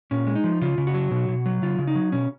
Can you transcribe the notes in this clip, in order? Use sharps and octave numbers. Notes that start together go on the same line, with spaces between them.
A#2 C#4
G#3
D#4
F3
C#3 F4
C#3
F#4
F#3
B2
B2
F#3
C#3 F4
C#3
D#4
F#3
B2 C#4